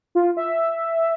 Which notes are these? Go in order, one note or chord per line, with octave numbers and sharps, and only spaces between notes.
F4
E5